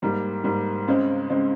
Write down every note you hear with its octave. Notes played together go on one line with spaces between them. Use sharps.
G#2 G3 A#3
G#2 G3 A#3
C#2 C#3 G#3 C4
C#2 C#3 G#3 C4